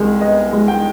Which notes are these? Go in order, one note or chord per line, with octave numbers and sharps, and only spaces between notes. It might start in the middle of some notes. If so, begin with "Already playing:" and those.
Already playing: C2 G#3
B3 D#5
G#3
G5